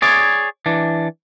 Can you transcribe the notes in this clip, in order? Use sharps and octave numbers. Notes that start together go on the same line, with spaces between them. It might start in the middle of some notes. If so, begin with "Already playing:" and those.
G#4 C#5 D5
E3 D4